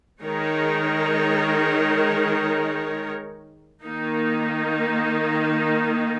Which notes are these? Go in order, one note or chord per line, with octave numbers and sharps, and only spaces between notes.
D#3 G#3 D#4 A#4 C#5
D#3 A#3 D#4